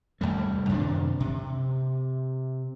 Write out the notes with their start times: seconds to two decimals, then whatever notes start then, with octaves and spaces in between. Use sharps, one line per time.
0.21 C2 G#2 G3 A3
0.69 F#2 C3 D#3 D4
1.20 C3